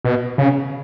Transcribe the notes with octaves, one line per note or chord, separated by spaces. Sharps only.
B2
C#3